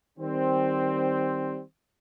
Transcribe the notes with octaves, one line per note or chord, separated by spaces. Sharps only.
D#3 G3 C4